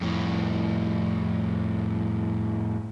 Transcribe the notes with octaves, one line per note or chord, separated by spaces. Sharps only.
F2 A2